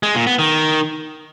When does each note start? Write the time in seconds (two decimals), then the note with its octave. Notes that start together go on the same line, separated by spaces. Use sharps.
0.03 G#3
0.15 A#2
0.27 B3
0.39 D#3